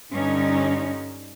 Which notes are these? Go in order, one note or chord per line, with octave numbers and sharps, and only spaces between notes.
G2 D3 C#4 D#4